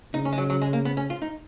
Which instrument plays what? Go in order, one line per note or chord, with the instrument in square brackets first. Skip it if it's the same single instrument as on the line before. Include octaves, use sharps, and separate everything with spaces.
[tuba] C#3 [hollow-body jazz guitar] D#4
[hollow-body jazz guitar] C#4
G#3
F#3
F#3
G#3
A#3
B3
C#4
F4
D#4